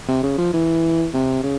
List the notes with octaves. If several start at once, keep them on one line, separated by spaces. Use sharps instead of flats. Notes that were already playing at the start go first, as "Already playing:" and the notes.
C3
C#3
F3
E3
C3
C#3